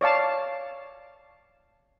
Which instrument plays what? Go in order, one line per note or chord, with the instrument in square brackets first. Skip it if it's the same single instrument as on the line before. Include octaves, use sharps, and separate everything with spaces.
[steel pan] C#5 D5 F5 A5